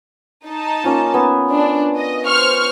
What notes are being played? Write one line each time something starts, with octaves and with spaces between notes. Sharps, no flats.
D#4 A5
A#3 C#4 F4
B3 G#5
D4
D#5
C5 C#6 F6